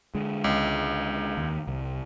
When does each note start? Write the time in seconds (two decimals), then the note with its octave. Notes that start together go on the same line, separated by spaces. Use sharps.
0.15 D3 G#3
0.44 C#2
1.38 D#2
1.68 C2